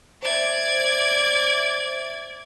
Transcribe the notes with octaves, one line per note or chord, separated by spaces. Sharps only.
C5 D5 E5 G#6